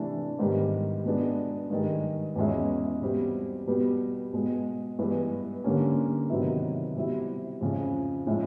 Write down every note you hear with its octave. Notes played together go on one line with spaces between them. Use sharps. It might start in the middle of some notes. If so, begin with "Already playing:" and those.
Already playing: C3 E3 A3 D4
G#2 D#3 G3 B3
B2 G#3 B3 D4
G2 D#3 G#3
E2 B2 G#3 C#4 E4
B2 G3 C4
B2 G3 B3
B2 G#3 B3
G2 E3 G#3 B3
D3 G3 A#3 C#4
C3 D#3 F#3 B3 E4
B2 G3 C4 E4
F2 C#3 F3
A2 F3 G#3 C#4 E4